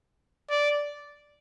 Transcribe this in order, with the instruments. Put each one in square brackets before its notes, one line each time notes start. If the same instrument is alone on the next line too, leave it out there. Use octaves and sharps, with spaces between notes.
[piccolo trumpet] D5